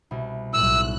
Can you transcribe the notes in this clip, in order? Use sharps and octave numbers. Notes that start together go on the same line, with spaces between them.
C2 B2
B1 A2 G3 E6 F#6 E7